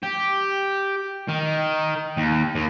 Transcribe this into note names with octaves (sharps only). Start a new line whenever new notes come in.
G4
D#3
D#2
D#2